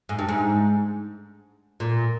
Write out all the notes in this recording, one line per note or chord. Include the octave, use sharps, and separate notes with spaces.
G#2
G2
G#2
A#2